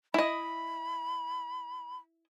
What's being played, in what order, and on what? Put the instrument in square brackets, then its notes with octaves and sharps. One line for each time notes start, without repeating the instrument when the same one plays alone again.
[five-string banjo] E4 D#5 [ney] B5